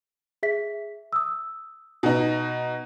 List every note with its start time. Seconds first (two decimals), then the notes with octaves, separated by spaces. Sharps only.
0.43 G#4 E5 B6
1.13 D#6 E6
2.03 B2 D#4